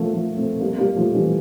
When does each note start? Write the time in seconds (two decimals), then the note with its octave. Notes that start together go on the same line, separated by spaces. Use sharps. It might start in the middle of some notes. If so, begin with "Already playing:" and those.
Already playing: F3 A3 A#3
0.13 F3 A3
0.37 A3 C4
0.60 G3 A#3
0.78 G3 A#3
0.95 F3 A3
1.14 E3 G3